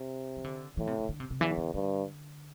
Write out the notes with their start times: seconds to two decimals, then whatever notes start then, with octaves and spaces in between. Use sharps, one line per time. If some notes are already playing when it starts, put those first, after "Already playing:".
Already playing: C3
0.37 E3
0.44 D3
0.77 A2 E3
0.87 C3
0.99 D3
1.09 D3
1.20 C3
1.30 C3
1.41 E2 E3
1.57 D3
1.74 G2 D3